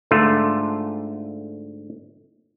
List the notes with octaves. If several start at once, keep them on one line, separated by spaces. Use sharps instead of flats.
G#2 D3 A3 F4